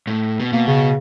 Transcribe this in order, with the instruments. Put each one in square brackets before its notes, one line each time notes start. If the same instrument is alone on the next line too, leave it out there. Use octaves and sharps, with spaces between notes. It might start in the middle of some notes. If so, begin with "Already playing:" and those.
[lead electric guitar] A2
B2
[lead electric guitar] B2 [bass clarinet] A#3
[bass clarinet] C#3